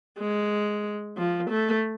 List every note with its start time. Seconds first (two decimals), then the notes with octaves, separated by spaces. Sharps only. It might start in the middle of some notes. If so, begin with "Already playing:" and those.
0.19 G#3
1.17 F3
1.50 A3